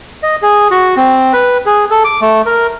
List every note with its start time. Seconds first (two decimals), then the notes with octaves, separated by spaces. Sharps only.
0.23 D#5
0.42 G#4
0.71 F#4
0.97 C4
1.33 B4
1.66 G#4
1.90 A4
2.04 D6
2.21 A3
2.46 A#4